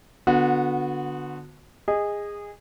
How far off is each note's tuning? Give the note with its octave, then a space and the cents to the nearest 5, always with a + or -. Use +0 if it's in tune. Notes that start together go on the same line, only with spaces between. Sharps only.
D3 +5 B3 +0 F#4 -30
G#4 -20 D#5 +0